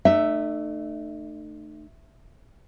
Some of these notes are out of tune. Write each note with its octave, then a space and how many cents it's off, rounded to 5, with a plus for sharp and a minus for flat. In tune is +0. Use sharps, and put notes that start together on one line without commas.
A3 +15 D#4 -40 E5 +0